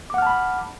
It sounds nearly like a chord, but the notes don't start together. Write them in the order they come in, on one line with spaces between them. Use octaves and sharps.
D6 F#5 F6 A5 B5